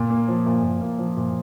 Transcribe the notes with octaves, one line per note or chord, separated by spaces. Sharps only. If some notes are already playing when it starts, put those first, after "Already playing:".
Already playing: A#2
A#3
F3
A#2
A#2
A#3
F3
A#2